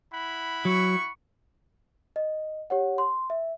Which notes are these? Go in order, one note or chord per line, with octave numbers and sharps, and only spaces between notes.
E4 F#5 B5
F#3 C#6
D#5
G4 C#5 F#5
C6
E5